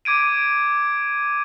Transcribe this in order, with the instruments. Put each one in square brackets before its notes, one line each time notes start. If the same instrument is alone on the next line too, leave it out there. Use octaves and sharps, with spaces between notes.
[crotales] D6 G#6 D7 D#7